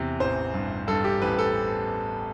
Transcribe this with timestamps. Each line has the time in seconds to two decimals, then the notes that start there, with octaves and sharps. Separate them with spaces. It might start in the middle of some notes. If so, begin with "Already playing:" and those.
Already playing: E2 C3
0.20 A1 C5
0.54 G2
0.88 G2 A4
1.04 G4
1.22 A1 B4
1.39 A4